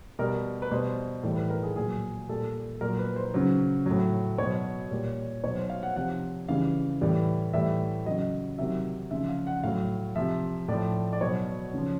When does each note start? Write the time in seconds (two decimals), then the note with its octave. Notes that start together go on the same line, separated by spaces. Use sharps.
0.19 B2 G3 A#4
0.62 B4
0.71 B2 G3 C5
1.23 A2 E3 G3
1.37 B4
1.50 A#4
1.63 G#4
1.76 A#2 F#3 G#4
2.29 A#2 G3 A4
2.81 A#2 F#3 A#4
2.99 B4
3.16 C5
3.34 C#3 F#3
3.86 A2 F#3
4.38 B2 F#3 C#5
4.91 A#2 G3
5.44 B2 F#3 C#5
5.57 C5
5.70 F5
5.83 F#5
5.96 C3 F3 F#5
6.48 C#3 E3 G3 F5
7.01 A2 E3 G3
7.53 A2 E3 G3 E5
8.06 C#3 F#3 D#5
8.58 C3 D#3 F#3 E5
9.11 C#3 F3 E5
9.29 F5
9.47 F#5
9.63 A2 F#3 F5
10.16 C3 F3 E5
10.68 A2 F3 D5
11.13 D5
11.21 B2 F#3 C#5
11.74 C#3 F3